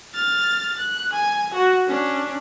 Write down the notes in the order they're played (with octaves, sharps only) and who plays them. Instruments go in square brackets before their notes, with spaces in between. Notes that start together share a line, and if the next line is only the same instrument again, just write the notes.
[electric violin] F6 A6
F#6
G#5
F#4
C#4 D4